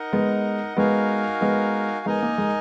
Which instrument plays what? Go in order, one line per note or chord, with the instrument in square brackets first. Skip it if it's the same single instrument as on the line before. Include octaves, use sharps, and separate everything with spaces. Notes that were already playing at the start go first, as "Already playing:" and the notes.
Already playing: [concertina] D#4 A#4 D#5 F#5
[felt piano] G#3 B3
[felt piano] G#3 B3 [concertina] D#4 F#4 A#4 F5 G#5
[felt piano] G#3 B3
[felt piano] G#3 B3 [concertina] D#4 A#4 D#5 G#5
[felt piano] A#3
G#3